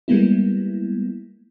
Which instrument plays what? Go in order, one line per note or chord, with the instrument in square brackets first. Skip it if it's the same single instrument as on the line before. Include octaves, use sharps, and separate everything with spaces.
[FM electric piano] G3 G#3 A#3 B3 E4